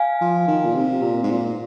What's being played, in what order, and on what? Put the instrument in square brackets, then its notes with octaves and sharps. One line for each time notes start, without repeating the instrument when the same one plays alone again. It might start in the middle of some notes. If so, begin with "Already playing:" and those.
Already playing: [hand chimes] F5 G#5
[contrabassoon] F3
D#3
A#2
C3
A#2
G#2
A#2